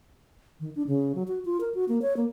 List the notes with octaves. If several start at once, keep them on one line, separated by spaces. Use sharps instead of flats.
D#3
D4
C#3
F#3
F#4
F4
A#4
F#4
A#3
C#5
A#3